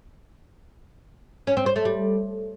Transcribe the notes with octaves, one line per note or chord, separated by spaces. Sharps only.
C#4
C4
C5
A3
G3